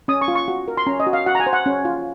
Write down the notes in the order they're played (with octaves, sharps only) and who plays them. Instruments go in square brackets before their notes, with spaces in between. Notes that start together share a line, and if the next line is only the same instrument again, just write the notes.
[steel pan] C#4 D#6
C#6
F4
C#6
F#4
A#4
C6
C#4 A#5
D#5
F#4
F5
F#4 F#5
A#5
G#5
C5
F#5
C#4
F4